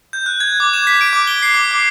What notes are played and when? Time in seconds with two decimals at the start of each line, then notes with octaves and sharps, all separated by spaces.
0.13 G6
0.26 F#6
0.40 G#6
0.60 D6
0.73 E7
0.87 B6
1.01 D7
1.13 D6
1.27 G7
1.42 C7
1.54 D6
1.71 D6